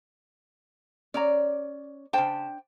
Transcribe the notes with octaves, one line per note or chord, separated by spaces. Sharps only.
C#4 C#5 D5 A#5
C#3 D4 C5 G5 A5